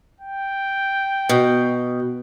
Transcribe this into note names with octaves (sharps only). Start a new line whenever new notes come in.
G5
B2